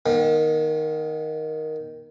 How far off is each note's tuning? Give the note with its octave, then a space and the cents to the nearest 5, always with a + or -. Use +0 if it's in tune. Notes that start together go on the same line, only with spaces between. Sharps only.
D#3 +0 B3 -45